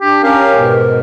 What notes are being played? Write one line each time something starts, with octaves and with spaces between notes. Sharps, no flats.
D4 G4
C#4 G4 A#4 F5
G#2 B2 A#4